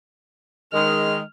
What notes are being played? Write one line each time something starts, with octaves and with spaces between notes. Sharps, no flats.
D#3 G#3 F6